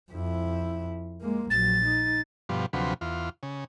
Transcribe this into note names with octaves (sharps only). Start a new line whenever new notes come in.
F2 E4
G#3 A#3
A#1 F#3 A6
D#4
G2 B2 F3
D2 C3 F3 F#3 B4
E2 F4
C#3